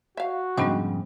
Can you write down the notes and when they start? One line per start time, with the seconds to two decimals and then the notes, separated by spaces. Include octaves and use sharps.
0.17 F#4 E5 F5
0.58 F2 G#2 C#3 G3 B3 C4 D4 D#4